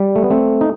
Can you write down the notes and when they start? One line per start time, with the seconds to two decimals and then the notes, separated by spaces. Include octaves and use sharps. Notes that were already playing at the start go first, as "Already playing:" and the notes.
Already playing: G3
0.16 A3
0.24 B3
0.30 A3 C4
0.61 D#4